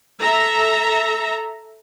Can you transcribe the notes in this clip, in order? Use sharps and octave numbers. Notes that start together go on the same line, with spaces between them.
A4 E5 A#5